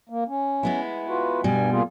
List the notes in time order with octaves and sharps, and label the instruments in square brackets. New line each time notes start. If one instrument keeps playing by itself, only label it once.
[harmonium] A#3
C#4
[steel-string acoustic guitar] G#3 B3 E4
[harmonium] F4 F#4 B4
[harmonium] G2 G#5 [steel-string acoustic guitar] B2 G3
[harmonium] A#3 F4 G#4